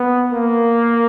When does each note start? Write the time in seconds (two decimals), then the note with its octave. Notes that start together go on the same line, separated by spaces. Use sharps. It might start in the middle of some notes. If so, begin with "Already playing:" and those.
Already playing: B3
0.33 A#3